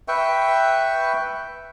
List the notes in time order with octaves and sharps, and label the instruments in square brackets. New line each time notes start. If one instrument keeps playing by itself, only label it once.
[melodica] B4 E5 G5 C#6